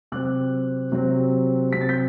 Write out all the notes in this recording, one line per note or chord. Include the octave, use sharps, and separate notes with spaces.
C3 F#3 C4 D6 F#6
C3 F#3 C4
C3 F#3 C4 B6
A6
G6 B6